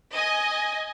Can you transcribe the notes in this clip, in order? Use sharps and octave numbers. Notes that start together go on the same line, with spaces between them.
D#5 G#5